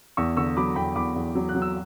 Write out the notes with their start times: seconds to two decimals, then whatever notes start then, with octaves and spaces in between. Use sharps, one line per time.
0.17 E2 C#6 E6
0.37 D3 C#6 E6
0.57 F#3 B5 D6
0.76 E2 G5 B5
0.95 E2 B5 D6
1.16 E2
1.35 F#3
1.49 F#6
1.55 F#3
1.62 E6